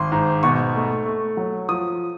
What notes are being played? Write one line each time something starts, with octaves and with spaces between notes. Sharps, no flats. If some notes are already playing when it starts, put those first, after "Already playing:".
Already playing: G#1 C6
G#2
B2 C#6
A3
A3
F#3
F3 D#6